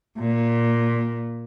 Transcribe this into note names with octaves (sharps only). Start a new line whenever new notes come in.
A#2